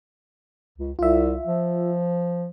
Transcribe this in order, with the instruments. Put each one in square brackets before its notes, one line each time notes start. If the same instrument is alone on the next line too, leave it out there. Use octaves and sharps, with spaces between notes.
[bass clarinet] C#2
[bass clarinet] C2 [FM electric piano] F4 E5
[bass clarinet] F3